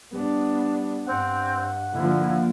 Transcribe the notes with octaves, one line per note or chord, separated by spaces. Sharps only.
G3 B3 D4
G2 C4 F#5
D3 F3 A#3 E4